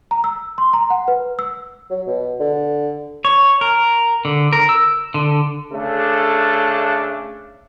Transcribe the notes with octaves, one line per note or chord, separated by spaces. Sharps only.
A#5
E6
C6
A#5
F#5
B4
E6
F#3
B2
D3
C#5
A#4
D3
A#4
E6
D3
C#3 A3 D4 A4